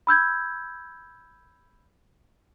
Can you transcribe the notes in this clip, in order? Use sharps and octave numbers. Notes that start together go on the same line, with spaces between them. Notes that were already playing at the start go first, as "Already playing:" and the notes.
B5 E6 G6 G#6